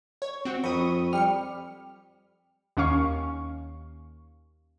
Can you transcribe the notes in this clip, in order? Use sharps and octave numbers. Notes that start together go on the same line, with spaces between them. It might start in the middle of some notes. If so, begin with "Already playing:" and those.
C#5
C4 F#4
F2 B5 C#6 D#6
G3 F6 C#7
D#2 C#4 F5 C#6